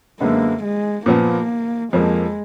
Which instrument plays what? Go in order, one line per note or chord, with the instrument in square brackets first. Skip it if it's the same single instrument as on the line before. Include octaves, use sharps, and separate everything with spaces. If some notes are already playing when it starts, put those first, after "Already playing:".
[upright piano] F#2 D3 G#3 B3 [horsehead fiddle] A#3
[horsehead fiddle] G#3
[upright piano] A#2 F3 B3 [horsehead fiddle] A#3
[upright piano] F2 F3 A#3 [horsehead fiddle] G#3